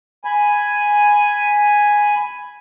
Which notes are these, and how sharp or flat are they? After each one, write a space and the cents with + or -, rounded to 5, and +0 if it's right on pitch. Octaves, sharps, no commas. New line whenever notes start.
G#5 +0 B5 +0